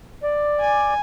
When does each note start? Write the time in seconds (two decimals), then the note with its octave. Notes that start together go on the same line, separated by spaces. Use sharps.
0.23 D5
0.61 G#5